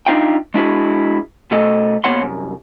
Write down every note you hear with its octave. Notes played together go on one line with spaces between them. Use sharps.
D4 D#4 F4 E5 G5
G#3 D4 E4 F#4 G#4
B2 A3 A4 D#5
D#2 A#2 B3 C#5 F#5 C6
C2 F#2